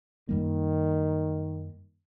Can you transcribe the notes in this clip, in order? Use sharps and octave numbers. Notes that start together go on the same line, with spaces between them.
F#2 D#3 G3 A#3